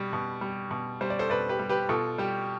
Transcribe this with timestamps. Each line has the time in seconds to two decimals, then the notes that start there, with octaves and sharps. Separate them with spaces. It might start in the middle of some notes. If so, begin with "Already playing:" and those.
Already playing: B2 G3
0.13 B2
0.41 G3
0.71 B2
1.01 G3 C5
1.10 D5
1.19 A4 C5
1.30 B2 B4 D5
1.49 G4 B4
1.59 G3
1.69 G4 B4
1.89 B2 F4 A4
2.18 G3 G4